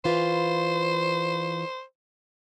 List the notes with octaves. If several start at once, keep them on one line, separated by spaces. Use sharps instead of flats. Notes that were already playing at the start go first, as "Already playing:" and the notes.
E3 F4 B4 C5